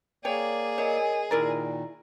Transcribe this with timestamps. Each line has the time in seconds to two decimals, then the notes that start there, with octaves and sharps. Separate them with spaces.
0.25 A#3 G#4 C#5 D5 G5
0.78 A#4 C#5 D#5 G#5
1.31 A#2 D#3 E4 A#4 D5 A#5